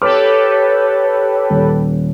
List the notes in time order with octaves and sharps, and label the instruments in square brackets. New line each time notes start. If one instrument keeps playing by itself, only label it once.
[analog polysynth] G4 A4 B4 [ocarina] C#5 [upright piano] D6 F6
[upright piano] D#1